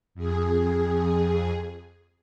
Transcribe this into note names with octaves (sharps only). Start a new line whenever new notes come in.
F2 G#4